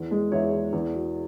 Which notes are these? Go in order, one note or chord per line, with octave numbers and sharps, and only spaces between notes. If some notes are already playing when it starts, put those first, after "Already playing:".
Already playing: E2
G#3
E2 C#5 E5
E2
E2
B2